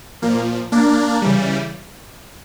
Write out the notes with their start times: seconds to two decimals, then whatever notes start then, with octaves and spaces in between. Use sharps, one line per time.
0.22 A#2 F3 A#3
0.72 A#3 D4
1.22 C#3 E3 G3